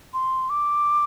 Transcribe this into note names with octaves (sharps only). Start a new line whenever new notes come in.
C6
D6